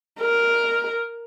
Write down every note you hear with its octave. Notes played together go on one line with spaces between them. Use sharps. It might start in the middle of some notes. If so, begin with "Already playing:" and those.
A#4